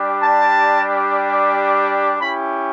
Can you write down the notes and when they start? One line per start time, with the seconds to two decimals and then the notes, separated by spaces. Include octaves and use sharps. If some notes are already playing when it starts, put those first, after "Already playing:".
Already playing: G3 D4 G4
0.21 A5
2.18 C#4 E4 G4 B5